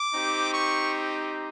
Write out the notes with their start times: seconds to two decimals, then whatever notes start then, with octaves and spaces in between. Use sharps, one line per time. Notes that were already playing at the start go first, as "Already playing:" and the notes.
Already playing: D6
0.14 C4 D#4 G4
0.54 C#6